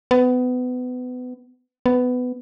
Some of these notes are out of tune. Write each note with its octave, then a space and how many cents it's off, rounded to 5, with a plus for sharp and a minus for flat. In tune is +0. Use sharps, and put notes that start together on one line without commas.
B3 +25
B3 +15